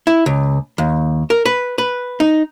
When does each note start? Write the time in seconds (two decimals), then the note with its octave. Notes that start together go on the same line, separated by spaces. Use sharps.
0.07 E4
0.26 C#2
0.78 D#2
1.30 A#4
1.46 B4
1.78 B4
2.20 D#4